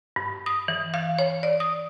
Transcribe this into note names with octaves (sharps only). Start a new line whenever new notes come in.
G2
D#6
E3
F5
C#5
D5
D#6